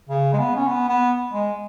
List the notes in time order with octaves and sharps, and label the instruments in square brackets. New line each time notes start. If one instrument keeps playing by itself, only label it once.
[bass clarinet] C#3
G#3
B3
C#4
B3
B3
G#3